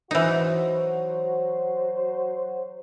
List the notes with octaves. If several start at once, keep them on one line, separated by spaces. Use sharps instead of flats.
E3 F#3 D#4 F#4 C5